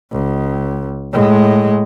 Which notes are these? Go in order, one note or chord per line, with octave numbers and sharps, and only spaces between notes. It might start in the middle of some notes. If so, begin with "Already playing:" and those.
C#2
A2 G#3